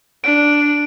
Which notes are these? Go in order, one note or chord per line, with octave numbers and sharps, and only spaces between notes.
D4 D7